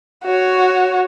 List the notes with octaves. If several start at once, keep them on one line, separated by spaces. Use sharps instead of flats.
F#4 C#5